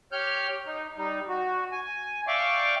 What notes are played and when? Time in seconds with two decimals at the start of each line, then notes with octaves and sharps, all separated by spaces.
0.12 G4 C#5 F6 G6
0.67 D#4
0.97 G3 D#4
1.29 F#4
1.72 G#5
2.27 D5 E5 F5 G5 C#6 D6